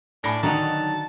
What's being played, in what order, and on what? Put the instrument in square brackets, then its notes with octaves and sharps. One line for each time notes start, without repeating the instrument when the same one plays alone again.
[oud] A2 [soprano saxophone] D4 [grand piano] G#5 B5 A#6
[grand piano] D3 D#3 A#5 [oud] F#3 D#4 [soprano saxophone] A5